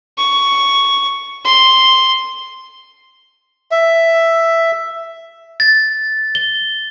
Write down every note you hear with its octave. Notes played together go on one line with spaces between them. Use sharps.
C#6
C6
E5
A6
G7